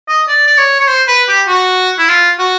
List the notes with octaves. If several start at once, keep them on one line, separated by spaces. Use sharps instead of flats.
D#5
D5
D5
C#5
C#5
C5
B4
G4
F#4
E4
F4
F#4